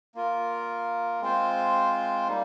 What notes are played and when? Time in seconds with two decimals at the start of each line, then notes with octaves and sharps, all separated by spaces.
0.15 A#3 F4 A#4
1.21 G#3 C4 F4 C5
2.28 G3 A#3 D#4